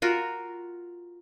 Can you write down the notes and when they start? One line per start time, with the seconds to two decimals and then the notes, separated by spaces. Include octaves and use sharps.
0.02 F4 F#4 A#4